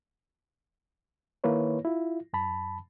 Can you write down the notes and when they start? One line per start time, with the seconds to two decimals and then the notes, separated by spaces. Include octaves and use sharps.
1.44 D#3 A#3 E4 B4 C#5
1.85 E4 F4
2.33 F#2 A5 B5